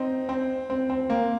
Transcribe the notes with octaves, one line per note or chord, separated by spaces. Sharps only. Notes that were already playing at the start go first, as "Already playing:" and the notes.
Already playing: C4 D#4
C4
C4
C4
A#3